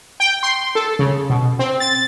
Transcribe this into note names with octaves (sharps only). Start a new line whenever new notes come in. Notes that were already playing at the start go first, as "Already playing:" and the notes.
G5
C6
A4
C#3
B2
C4
A6